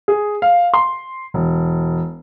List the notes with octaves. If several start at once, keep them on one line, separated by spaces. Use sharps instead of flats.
G#4
F5
C6
E1